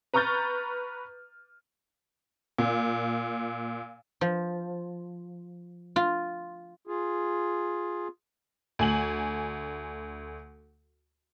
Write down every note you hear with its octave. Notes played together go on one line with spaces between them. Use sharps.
B4 A#5 C#6 F6 G6 A6
A#2
F3
F4
F4 G#4
D2 G#5 F#7